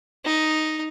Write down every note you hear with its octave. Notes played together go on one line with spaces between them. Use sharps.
D#4